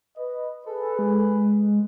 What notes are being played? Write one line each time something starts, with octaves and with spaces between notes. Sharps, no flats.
B4 D#5
G#4 A4 B4
G#3